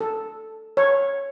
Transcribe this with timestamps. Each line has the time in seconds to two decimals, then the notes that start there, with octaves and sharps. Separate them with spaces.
0.01 A4
0.77 C#5